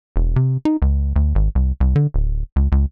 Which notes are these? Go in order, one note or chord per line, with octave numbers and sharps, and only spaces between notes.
E1
C3
D#4
C#2
D2
G#1
C2
C2
D3
D1
C#2
C#2